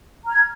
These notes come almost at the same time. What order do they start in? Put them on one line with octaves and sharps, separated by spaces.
A#5 F6 G#6